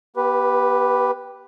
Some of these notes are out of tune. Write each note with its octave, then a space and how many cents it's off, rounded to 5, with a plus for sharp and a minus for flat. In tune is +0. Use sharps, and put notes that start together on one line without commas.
B3 -40 G4 +0 B4 +0